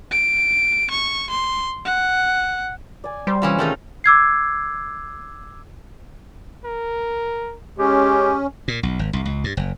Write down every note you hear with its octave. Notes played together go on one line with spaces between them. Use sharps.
D7
C#6
C6
F#5
D5 G#5
G3 C5
C3 E3 C#4 F4
D#3 G#3 A3 C#4 D#4 G#4
D6 E6 G#6 C7
A#4
G#3 C#4 G4
A#2
B1
G#1
C2
C#2
G2
F#1